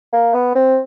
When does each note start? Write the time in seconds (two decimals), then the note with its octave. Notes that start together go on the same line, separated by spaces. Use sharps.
0.13 A#3
0.34 B3
0.55 C4